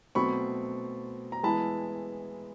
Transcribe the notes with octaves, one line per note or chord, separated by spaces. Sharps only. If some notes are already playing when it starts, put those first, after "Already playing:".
B2 F#3 A3 C4 B5 C#6
A#5
E3 G#3 B3 E4 A5 B5